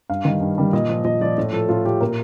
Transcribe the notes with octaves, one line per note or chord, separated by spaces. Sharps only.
G2 F5
D#3 G3
G2
D#3 G3
A#2 D#5
F3
A#2 D#5
F3 D5
A2
F3 A4
A2 F4
F3 G4
A#2 A#4